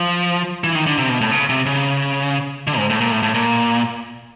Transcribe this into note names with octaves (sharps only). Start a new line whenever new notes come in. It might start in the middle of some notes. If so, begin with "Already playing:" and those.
Already playing: F3
E3
D#3
D3
C3
B2
A2
C#3
C3
C#3
D3
G#2
A2
A#2
A2
A2
A#2